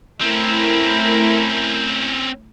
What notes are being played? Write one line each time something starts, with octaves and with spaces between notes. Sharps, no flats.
A3 C4 C#4 E4 A#4